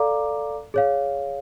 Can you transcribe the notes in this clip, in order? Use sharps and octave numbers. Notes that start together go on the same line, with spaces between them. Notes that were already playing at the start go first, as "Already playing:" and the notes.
Already playing: A4 D5 F5 A#5 D6
G#4 C#5 F5